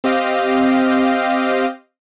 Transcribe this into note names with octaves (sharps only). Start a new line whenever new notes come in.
C4 G4 D#5 F5